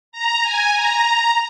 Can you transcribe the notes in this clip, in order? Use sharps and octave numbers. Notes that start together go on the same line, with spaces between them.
A#5
G#5
A#5